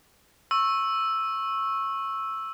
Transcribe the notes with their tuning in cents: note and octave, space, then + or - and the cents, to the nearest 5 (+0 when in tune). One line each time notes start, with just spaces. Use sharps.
C#6 -20 E6 +0